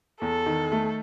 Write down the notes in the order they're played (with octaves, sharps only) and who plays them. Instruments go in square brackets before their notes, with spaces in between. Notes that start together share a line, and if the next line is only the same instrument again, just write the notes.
[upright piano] E2 [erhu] A4
[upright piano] D#3
A3